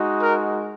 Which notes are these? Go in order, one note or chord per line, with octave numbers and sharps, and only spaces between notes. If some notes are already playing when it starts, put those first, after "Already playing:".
Already playing: G#3 D#4 F#4
A#4